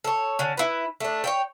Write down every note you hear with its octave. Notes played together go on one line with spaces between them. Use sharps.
A4 C#5
D3 C#4
E4 B4
A3 D4
C#5 E5 G5